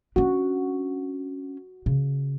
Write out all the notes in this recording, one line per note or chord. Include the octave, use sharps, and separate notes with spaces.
C#4 D4 F#4
C#3